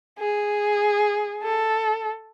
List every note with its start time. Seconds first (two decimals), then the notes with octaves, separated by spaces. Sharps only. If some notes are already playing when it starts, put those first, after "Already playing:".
0.19 G#4
1.43 A4